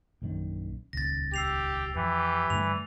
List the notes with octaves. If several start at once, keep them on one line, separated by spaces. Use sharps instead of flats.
A#1 F#2 D#3
D#1 C#2 A6 A#6
G4 E6 C7 F7
F2 E3 G4
G2 D3 A3 F7